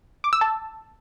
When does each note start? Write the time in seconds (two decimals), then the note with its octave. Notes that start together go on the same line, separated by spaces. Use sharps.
0.24 D6
0.33 E6
0.41 A5